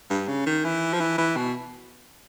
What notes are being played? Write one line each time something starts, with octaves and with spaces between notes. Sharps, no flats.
G2
C#3
D#3
E3
F3
E3
E3
B2